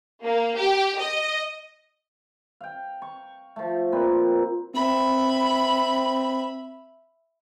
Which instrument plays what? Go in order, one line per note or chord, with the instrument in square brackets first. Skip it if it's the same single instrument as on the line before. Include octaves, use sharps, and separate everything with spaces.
[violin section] A#3
G4
D#5
[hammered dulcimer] F5 G5
C#6
F3 A3
A#2 A#3 C4 B4
[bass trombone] C4 [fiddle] E5 B5